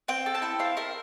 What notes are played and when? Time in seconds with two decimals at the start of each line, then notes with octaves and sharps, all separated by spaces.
0.08 C4 G5
0.26 A4
0.35 A5
0.42 E4 G5
0.59 C4 F5
0.77 E4 A#4